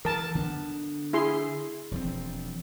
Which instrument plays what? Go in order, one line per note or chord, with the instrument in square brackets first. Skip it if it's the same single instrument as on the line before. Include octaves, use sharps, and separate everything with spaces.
[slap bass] E3 [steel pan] A#4 A5
[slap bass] D3 B3
[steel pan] E4 G#4 C6
[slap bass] E1 F3 C4